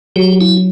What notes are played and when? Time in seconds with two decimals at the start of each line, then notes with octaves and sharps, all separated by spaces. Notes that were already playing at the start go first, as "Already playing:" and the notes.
0.16 F#3 G4
0.41 E4